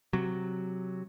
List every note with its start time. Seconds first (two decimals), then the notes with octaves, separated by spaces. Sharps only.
0.13 C3 F#3